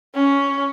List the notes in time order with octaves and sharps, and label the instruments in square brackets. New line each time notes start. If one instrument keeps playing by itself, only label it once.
[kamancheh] C#4